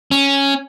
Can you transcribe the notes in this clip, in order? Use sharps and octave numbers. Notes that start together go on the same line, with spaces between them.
C#4